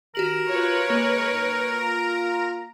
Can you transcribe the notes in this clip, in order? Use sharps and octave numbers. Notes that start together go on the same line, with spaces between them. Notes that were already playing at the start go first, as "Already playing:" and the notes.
D#3 F#4 G4 A#4 F#7
F4 B4 C#5
C#3 G#3 A#3
F#2 D#4
F4 A#5